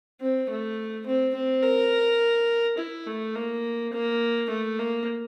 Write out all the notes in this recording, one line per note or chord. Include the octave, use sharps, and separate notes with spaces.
C4
A3
C4
C4
A#4
E4
A3
A#3
A#3
A3
A#3